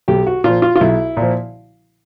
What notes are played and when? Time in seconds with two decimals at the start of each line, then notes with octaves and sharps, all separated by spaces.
0.08 B1 G4
0.27 F#4
0.44 A#2 F3 F4
0.62 F4
0.76 F4
0.81 B1 E4
1.17 A#2 F3